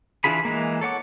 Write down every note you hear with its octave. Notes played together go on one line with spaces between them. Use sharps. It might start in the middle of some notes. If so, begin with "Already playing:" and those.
E3 D4 F4 G#4 B5
E3 G#3 A#3
A4 C#5 F#5 D6